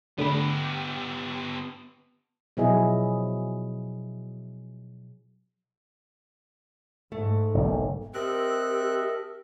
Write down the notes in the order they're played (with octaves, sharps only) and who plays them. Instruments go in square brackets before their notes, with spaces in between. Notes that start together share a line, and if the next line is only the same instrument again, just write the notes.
[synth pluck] D3 A3 B5 [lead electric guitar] B3 G4
[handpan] B2 F3 F#3 E4 G#4 D#5
[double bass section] G#2 [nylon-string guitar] A3
[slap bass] F#1 B1
[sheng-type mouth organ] C4 F#6 [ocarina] G4 [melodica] A4 D#5 E5 [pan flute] A#4